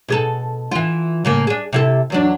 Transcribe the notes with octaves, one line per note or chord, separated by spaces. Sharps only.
B2 G#4 A4
E3 F4
A2 C#3 A#3
D4 G#4
C3 E4 A4
E2 F#3 D4